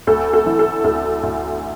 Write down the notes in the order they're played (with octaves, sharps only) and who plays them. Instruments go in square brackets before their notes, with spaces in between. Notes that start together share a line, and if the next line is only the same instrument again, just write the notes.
[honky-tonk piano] D2 A4
A4
E3
A4
D2 A4
D2